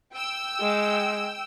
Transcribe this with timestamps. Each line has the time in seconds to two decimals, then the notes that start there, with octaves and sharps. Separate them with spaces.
0.13 G5 E6
0.61 G#3